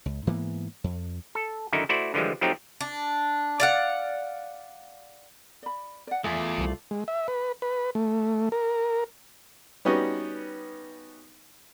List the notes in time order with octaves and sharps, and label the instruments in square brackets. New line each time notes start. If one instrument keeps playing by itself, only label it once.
[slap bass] C#2
G#2 E3 A#3 B3
F2
[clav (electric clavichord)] A4
F#2 D3 D#3 D#4 E4
A3 E4 F#4 C5 D5
D3 E3 F3 G3 G#3
F3 F#3 A3 C4 D#4 G4
[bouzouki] D4
D5 F5 F#5
[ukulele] D5 B5
D5 F#5
[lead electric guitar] E2 [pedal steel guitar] A3 F4 D5 [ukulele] E5 G#5
[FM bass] C2
[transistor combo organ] G#3
E5
B4
B4
A3
A#4
[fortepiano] G3 B3 C#4 D#4 F#4